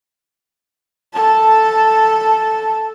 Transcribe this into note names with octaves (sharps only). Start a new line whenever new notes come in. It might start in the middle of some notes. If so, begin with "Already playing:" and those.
A4 A5